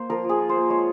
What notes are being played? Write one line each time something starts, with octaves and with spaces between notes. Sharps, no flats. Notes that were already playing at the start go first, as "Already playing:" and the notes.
Already playing: A#3 C5
F3 A#4
F3
G#4
F4
C5
A#3
G#3 C#5